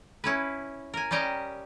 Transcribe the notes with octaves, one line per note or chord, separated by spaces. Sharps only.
C#4 E4 B4
A#4 G#5
G3 C#4 G4 D#5 A#5